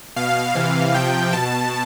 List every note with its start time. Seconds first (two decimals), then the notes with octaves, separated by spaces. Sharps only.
0.16 B2 F5
0.55 C3 E3 F5
0.94 C3 F3 G5
1.33 B2 A5